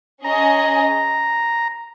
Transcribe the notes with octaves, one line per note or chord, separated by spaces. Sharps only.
C#4 G#4 D#5 G#5 A#5